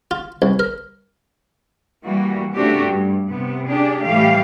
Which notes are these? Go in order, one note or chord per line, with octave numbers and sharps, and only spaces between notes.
F4
C2
A#4
E3 G3 A#3 F#4
C#3 A3 C4 D4 F#4 G4
G2
C3 B3
D4 G4 G#4
A2 E3 G3 A3 G4 F5